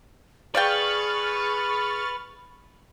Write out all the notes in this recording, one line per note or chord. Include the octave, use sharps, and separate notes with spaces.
G#4 B4 D5 F5 G5 C#6 F6 A6